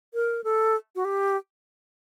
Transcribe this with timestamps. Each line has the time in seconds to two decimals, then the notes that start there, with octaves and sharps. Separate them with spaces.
0.14 A#4
0.44 A4
0.96 F#4
1.05 G4